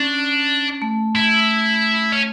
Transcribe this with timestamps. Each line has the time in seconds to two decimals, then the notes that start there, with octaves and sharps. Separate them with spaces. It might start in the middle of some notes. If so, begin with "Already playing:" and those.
Already playing: C#4 D4
0.82 A3
1.15 E4
2.12 C#4